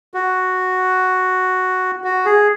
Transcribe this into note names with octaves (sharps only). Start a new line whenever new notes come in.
F#4
F#4
G#4